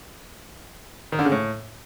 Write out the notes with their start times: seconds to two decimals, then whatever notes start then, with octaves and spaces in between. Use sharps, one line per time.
1.12 D#3
1.19 D3
1.25 C#3
1.32 A2